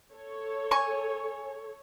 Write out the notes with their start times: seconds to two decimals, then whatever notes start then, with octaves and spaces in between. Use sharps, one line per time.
0.13 A4 C#5
0.71 G#5 C#6